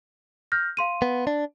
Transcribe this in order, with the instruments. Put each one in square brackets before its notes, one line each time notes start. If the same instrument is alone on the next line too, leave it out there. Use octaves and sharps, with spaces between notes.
[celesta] F6 G6 A#6
F5 C6 D#7
[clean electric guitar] B3
D4